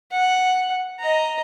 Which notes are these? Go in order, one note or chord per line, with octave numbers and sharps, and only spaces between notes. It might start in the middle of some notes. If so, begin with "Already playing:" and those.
F#5
D#5 A#5